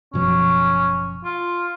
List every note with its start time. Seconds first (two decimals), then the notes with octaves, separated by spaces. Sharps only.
0.13 F#1 B2 F3 C#4
1.24 F4